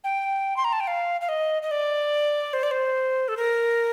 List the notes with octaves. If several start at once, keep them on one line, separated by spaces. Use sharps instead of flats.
G5
C6
A#5
A5
G5
F5
F5
D#5
D#5
D5
C5
D5
C5
A4
A#4